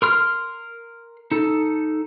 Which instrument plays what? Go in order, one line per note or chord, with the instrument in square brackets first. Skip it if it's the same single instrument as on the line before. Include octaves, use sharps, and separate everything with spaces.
[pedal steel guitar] A#4 C6 F6
D#4 A4